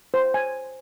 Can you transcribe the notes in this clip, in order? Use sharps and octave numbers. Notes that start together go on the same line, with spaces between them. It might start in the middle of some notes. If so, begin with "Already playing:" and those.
C5
G#5